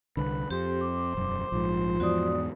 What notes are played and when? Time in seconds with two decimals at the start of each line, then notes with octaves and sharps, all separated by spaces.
0.17 C2 D3 B4
0.51 F2 G4 C5
0.81 D6
1.15 E1 F#2
1.52 A#1 G#2 F3
2.00 E2 G#2 F#4 D5 D#6